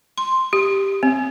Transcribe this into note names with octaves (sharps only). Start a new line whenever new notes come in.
C6
G4
C4